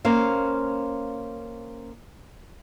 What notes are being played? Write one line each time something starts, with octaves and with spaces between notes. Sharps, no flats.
A#3 C#4 C5 F5